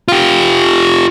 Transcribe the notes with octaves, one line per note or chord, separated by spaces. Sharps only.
F4 G4